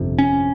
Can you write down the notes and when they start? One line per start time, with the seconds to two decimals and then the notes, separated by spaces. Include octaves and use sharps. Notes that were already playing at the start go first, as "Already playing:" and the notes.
Already playing: G1 F2 C3
0.19 C#4